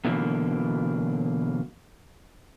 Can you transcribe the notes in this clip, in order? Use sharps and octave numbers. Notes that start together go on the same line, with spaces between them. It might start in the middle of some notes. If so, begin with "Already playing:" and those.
B2 D3 E3 F#3 A#3